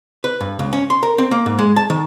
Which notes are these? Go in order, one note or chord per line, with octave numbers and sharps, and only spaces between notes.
B4
G2
C#2
C#4
C6
A#4
C4
A#3
G#2
G#3
A5
D#3